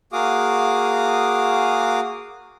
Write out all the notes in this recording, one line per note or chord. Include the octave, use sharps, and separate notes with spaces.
A#3 F#4 G#4 F5 D6 D#6